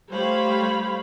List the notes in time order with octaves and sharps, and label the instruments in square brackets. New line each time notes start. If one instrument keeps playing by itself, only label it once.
[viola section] G3 A3 C5 C#5 F5 B5